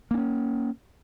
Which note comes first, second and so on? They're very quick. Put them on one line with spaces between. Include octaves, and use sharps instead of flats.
A#3 D4 C#4